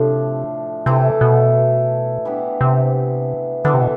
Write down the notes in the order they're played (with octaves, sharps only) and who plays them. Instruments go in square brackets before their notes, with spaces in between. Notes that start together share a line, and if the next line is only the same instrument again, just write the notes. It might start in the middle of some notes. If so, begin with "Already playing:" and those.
Already playing: [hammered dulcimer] A2 F3 A3 D4 [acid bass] C3
[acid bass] C3 [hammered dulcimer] E3 A3 E4 A4
[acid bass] B2
[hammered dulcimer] E3 B3 D4 G4
[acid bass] C3
[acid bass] D3 [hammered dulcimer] E3 B3 E4 A4
[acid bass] C3
B2